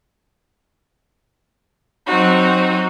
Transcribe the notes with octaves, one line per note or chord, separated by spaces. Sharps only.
F#3 C4 D#4 F#4